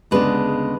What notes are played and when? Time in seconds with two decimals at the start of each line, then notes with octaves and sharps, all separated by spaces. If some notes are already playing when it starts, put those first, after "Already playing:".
0.11 D2 C#3 G#3 B3 D4 B4